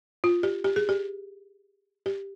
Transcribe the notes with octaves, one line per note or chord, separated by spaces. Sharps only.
F4
G4
G4
G#4
G4
G4